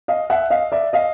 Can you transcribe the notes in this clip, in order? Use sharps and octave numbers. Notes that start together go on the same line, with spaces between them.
D#5 F5
E5 F#5
D#5 F5
D5 E5
D#5 F5